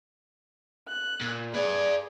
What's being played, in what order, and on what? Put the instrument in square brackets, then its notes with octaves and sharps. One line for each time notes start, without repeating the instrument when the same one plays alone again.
[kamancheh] F#6
[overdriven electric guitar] A#2
[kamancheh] G#4 [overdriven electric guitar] B4 D5